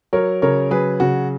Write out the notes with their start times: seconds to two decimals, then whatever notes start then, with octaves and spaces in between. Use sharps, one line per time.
0.13 F#3 A#4 C#5
0.42 C#3 A#4 C#5
0.71 F#3 G#4 B4
1.00 C#3 F#4